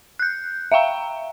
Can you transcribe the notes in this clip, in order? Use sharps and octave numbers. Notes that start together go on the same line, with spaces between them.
F#6 G6
E5 F5 G5 A#5